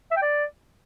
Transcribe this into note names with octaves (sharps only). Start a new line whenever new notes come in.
E5
G5
D5